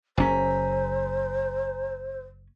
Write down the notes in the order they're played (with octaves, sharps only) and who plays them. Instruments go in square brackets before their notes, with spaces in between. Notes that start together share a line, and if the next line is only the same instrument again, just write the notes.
[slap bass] F#1 C#4 [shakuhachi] C5 [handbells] G#5 A#5 B6